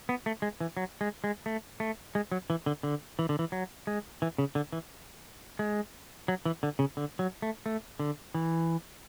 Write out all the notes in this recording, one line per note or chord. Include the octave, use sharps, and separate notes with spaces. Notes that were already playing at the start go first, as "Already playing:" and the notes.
B3
A3
G#3
E3
F#3
G#3
G#3
A3
A3
G#3
F#3
E3
D3
D3
E3
D3
E3
F#3
G#3
E3
C#3
D3
E3
G#3
F#3
E3
D3
C#3
D3
F#3
A3
A3
D3
E3